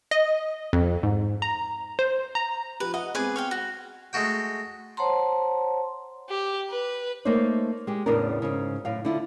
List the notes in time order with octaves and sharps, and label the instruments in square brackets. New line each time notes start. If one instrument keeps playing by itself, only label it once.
[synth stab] D#5
F2
G#2
A#5
C5
A#5
[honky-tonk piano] F3 G4 [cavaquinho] B4
[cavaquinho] D#5 [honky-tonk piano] F#5
[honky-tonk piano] G#3 B3 C4 [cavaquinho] G#4 B4 D6
[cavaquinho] C#5 F5 G5
F#4
[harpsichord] G#3 A3 F#4 G5
[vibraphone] C5 C#5 F#5 A5 A#5 C6
[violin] G4
B4
[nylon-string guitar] A3 A#3 D#4 C5 C#5
G#3 G4
E2 A2 C#3 B3 D4 A#4
G#2 C#3
F#2 A2 F5
D3 E4 F4